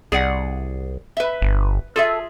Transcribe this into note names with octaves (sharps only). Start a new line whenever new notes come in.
C2 G#4 D5 F#5
B4 E5
G1
F4 G#4 A4 E5